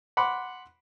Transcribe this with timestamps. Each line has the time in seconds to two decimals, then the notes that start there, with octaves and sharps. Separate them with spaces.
0.17 F#5 B5 C6 D6